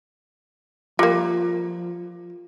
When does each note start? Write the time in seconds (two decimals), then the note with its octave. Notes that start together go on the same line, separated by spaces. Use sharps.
0.99 F3 G3 A#3 F4